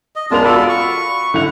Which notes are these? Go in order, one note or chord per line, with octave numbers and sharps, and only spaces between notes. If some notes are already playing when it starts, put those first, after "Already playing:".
D#5
G#3 B3 D4 F4 A#4 F7
F4 F#4 A4 D5 B5
C#6
D3 E4 E5 F#5 F7